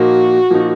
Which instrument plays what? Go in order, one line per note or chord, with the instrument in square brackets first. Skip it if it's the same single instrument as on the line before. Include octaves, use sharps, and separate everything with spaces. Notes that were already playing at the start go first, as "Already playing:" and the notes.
Already playing: [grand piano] A#2 F3 A#3 D#4 [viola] F#4
[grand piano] A#2 F3 A#3 D#4